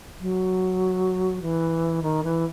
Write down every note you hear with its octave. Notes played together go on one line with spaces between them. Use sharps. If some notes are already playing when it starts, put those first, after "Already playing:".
F#3
E3
D#3
E3